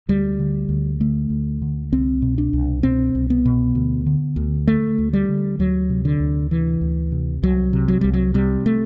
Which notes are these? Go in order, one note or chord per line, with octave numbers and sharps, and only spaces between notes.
D2 G3
D3
D2
D3 A3
D2
D3
C2 C4
B2
D4
C2
B2 C4
C2
B3
B2
D2
D3
D2
D3 A3
D2
G3
D3
D2 F#3
C3
D3
D2
C3 E3
D2
C3
C2 F#3
C3
F#3
C2 G3
F#3
C3 G3
A3